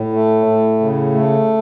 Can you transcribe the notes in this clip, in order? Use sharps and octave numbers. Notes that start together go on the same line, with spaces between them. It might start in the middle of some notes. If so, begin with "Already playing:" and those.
Already playing: A2
A3
A2
C#3
A3